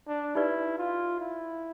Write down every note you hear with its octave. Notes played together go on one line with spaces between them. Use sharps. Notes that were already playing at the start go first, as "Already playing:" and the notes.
D4
D#4 E4 G4 B4 D5
F4
E4